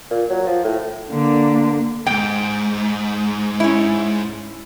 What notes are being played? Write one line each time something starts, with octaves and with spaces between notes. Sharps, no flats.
A#2
F#3
F3
A2
D3 A#3
D#2 G#2 G5
C#4 E4